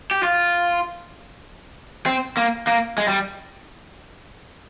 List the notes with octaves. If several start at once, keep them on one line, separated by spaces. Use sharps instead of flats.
G4
F4
C4
A#3
A#3
G#3
G3